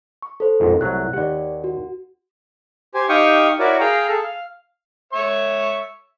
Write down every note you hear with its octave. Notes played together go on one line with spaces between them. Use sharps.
C#6
A4 C5
A#1 F2 G#2
C2 F#3 A3 F#6
D#2 G4 D5 F#5
F#4
G4 C5 G#5
D#4 G4 F5 G5 C#6 D#6
E4 F#4 A#4 C#5 D5
G#4 F5 G5 A#5
G#4 A4
F5
C#5 E5 C#6